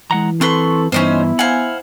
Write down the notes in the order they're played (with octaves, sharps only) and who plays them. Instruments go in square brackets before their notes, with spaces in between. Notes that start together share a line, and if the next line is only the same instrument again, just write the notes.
[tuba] E3 [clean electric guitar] G#3 F#5 A#5
[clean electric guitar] C4 B4 [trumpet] A4 [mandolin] C6 C#6
[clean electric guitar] G2 E3 [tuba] B3 [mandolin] C#4 D#4 C5 [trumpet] E4
[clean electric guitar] C5 F#5 [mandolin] F5 G#5